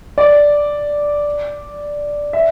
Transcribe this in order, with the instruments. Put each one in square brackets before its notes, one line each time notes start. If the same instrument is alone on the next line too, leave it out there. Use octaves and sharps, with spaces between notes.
[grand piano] D5
E5